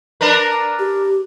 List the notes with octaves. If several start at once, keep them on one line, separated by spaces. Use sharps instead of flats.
D4 A#4 B4
G4